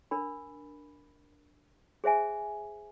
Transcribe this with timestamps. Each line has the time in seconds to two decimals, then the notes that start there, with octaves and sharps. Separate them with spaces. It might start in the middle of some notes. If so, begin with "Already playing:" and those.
0.11 D4 A#4 B5
2.04 G#4 C5 E5 G#5